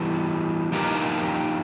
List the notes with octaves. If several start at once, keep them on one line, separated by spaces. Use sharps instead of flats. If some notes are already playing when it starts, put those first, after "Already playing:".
Already playing: E3 G3 B3
F3 A#3 D#4 G4 A#4